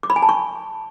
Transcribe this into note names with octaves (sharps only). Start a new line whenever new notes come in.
D6
B5
G#5
A5
C#6